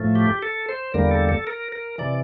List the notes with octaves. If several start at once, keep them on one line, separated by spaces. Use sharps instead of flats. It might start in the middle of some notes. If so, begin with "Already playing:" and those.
Already playing: A2 F3 A3
G4
A4
C5
E2 D3 G3 A#3 A#4
A4
A4
A#4
A#4
C3 E3 D5